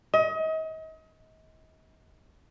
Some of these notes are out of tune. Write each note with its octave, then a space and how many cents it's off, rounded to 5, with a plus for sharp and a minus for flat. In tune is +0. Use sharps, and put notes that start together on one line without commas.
D#5 +35